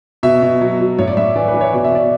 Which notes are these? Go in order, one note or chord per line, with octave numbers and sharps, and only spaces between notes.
B2 E5
B2
F#3
F#3
A2 C#5
D5
A2 E5
E3 D5
B4
E3
C#5
B2 D5
E5
B2 D5